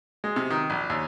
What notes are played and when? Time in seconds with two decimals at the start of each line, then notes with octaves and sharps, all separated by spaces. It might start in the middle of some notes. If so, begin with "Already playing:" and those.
0.24 G#3
0.36 C3
0.50 D#3
0.70 A#1
0.90 D#2